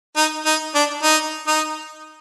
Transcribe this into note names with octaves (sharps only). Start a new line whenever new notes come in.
D#4
D#4
D4
D#4
D#4